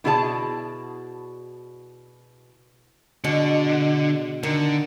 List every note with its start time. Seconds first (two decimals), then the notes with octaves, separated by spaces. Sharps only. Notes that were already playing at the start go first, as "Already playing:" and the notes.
0.04 B2 E4 F#4 G#4 D5 A5
3.24 B2 D3 G#3
4.43 D3 D#3